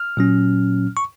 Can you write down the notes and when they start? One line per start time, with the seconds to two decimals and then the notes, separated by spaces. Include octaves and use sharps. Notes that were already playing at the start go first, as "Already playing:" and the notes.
Already playing: F6
0.17 A#2 F#3 C#4
0.97 C#6